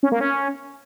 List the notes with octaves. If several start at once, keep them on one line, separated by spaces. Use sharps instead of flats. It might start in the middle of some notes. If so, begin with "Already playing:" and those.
C#4
A#3
C#4